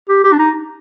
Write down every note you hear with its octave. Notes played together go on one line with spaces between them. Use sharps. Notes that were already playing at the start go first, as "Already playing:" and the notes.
G4
G4
D4
D#4